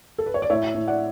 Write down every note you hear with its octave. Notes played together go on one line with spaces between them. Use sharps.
A4
B4
C#5
D5
A2 C#5 E5
A2
D5 F#5